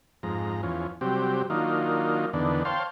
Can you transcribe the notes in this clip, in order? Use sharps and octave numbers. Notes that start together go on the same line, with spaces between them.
F2 G#2 A#5
E2 F3 C#4
C3 F#3 G3 C4 G4
D#3 F#3 A#3 D4 D#4 F4
E2 D3 D#3 B3 D4
C5 C#5 F5 G5 A5 C6